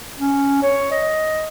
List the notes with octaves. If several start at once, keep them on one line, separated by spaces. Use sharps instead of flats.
C#4
C#5
D#5